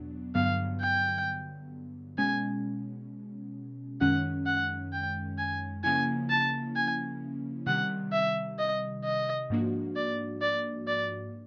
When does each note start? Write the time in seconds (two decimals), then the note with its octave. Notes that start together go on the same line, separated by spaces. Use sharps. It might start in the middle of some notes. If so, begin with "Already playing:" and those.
Already playing: E2 B2 F#3 B3 D4
0.35 G2 D3 F#3 B3 F5
0.81 G5
2.18 B2 G#3 C#4 G#5
4.01 F#2 D#3 G#3 C#4 F#5
4.46 F#5
4.93 G5
5.38 G#5
5.84 C#3 F3 A#3 C#4 E4 G#5
6.29 A5
6.76 G#5
7.66 C3 D#3 G3 F#5
8.13 E5
8.58 D#5
9.04 D#5
9.50 G#2 F3 A#3 D4 F#4
9.96 D5
10.41 D5
10.87 D5